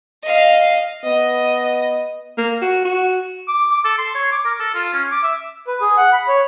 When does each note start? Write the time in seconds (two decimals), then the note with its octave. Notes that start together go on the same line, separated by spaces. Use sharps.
0.24 D#5 F5
1.04 B3 D#5
2.38 A#3
2.62 F#4
2.85 F#4
3.48 D6
3.71 D6
3.84 A4
3.98 C6
4.15 C#5
4.32 D6
4.45 A#4
4.60 A4
4.74 F4
4.93 C#4
5.11 D6
5.24 E5
5.67 B4
5.81 G#4
5.97 F#5
6.13 B5
6.28 C#5